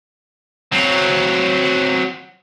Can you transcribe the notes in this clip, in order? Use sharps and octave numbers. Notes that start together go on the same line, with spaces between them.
F#3 C4